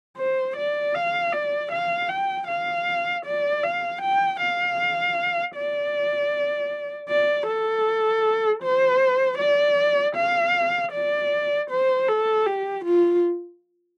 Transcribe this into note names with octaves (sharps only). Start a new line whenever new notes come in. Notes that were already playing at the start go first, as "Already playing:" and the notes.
C5
D5
F5
D5
F5
G5
F5
D5
F5
G5
F5
D5
D5
A4
C5
D5
F5
D5
C5
A4
G4
F4